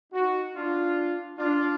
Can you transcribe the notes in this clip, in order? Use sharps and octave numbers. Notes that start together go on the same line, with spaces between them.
D#4 F#4
D4 F4
D4 F4